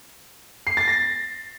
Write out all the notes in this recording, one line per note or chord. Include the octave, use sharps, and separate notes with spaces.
C7
A6
A#6